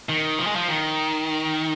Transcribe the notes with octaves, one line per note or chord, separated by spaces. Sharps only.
D#3
F3
G#3
F3
D#3